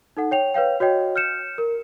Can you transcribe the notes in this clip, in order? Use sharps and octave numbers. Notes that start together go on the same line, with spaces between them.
D#4 A4 F#5
C#5 G5 F7
B4 C#5 F5 G5
F#4 C#5 D#5 G5
F6 G6 C#7 E7
A#4